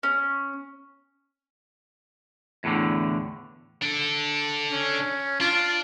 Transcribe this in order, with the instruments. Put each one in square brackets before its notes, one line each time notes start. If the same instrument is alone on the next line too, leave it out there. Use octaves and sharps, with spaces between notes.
[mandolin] C#4
[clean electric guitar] E2 A2 D3
[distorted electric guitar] D4 A4
[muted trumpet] C#4
[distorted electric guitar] D4 [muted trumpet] F4